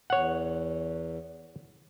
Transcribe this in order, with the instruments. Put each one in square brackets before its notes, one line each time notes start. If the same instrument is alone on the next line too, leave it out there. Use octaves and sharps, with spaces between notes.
[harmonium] E2 [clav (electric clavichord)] C#5 F#5